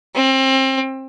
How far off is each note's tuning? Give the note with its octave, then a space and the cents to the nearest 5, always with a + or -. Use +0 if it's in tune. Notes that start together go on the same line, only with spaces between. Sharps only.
C4 +30